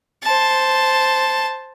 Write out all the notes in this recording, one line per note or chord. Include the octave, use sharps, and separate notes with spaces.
C5 A5